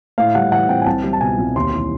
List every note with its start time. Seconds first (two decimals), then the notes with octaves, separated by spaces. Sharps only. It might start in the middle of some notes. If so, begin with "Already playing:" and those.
0.18 A2 F5
0.35 G3 F#5
0.52 E3 F#5
0.69 C4 G5
0.82 G#5
0.86 C2 A5
1.04 G3
1.13 A5
1.21 B2 G#5
1.39 C2
1.55 D#2 C6
1.72 E3